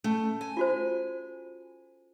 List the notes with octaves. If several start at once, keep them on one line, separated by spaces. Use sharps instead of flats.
A3 C#4
G#5
F4 F#4 C5